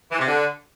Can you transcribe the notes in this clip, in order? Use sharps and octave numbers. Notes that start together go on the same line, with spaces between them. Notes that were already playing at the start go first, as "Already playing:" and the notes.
E3
C3
D3